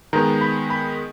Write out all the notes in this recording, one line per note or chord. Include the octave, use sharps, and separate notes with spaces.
D#3 G#3 B3 A#5
B5
B5